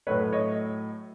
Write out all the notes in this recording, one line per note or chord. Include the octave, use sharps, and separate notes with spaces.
A2 F#3 A3 B4 C#5
C#5 D#5